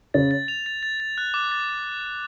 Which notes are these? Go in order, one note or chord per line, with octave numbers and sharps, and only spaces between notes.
C#3 C#4 A6
A6
F7
A6
A6
A6
F#6
D6
A6